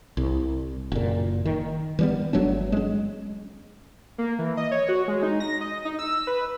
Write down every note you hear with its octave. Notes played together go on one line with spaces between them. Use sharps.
C2
F#1 A#2
D#3
E3 G3 B3
G1 F#3 A3 D4
G#3 C#4
A#3
E3
D#5
C#5
F#4
G#3
D#4
A#6
D#5
D#4
E6
B4